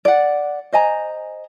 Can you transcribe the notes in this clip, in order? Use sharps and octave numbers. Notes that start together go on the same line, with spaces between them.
D5 F#5
C5 D#5 G#5 A#5